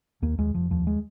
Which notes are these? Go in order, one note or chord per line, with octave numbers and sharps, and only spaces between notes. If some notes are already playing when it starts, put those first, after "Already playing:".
D#2 A#3
D#2 G#3
F1 F3
D#2 F3
G#3